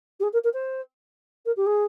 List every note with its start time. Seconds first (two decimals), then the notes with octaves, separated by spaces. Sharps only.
0.20 G4
0.23 G#4
0.33 A#4
0.44 A#4
0.53 C5
1.45 A#4
1.56 G4
1.66 G#4